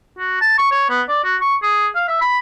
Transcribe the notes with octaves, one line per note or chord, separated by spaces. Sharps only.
F#4
A5
C#6
C#5
B3
D5
F#4
C#6
G#4
F5
E5
B5